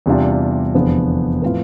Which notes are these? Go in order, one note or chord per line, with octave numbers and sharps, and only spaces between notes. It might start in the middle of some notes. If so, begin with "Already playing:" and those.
E2 C3 G3 D4 F4
F1 E2 D3 F3 B3 C5
A2 F3 C4 F4 B4